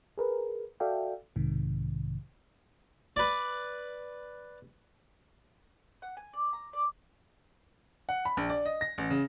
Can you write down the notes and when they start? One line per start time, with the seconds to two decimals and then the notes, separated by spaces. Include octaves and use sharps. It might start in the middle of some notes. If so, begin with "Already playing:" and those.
0.18 G#4 A#4 B4
0.80 F#4 A4 D5 E5 F5 G5
1.36 B1 G#2 C3 D#3
3.16 B4 D5
6.02 F#5
6.17 G#5
6.33 D5
6.53 A#5
6.73 D5
8.09 F#5
8.25 B5
8.37 A#1
8.50 D5
8.66 D#5
8.81 A#6
8.98 A1
9.10 C#3